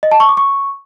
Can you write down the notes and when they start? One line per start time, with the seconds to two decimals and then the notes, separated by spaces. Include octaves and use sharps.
0.03 D#5
0.12 A5
0.20 C#6
0.29 D6
0.37 C#6